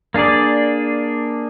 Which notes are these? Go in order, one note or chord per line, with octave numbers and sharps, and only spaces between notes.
A#3 D4 G#4 D5